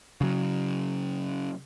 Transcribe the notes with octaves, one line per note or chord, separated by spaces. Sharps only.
C#3 F#3